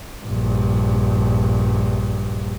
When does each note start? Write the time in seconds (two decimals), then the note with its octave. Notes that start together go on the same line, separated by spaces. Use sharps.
0.24 A#1 G2